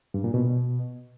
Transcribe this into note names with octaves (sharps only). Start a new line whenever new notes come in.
G2
A#2
B2